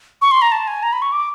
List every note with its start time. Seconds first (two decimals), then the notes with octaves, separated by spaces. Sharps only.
0.21 C#6
0.31 C6
0.42 A#5
0.52 A5
0.67 G#5
0.83 A#5
0.92 B5
1.02 C#6
1.12 D6